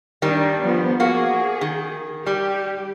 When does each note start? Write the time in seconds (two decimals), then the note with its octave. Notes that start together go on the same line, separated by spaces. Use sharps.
0.22 D#3 G3 D4
0.62 F3 B3
1.00 A#3 F#4 G#4
1.61 D#3
2.27 G3 G4